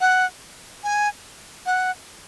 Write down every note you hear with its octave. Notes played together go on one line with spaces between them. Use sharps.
F#5
G#5
F#5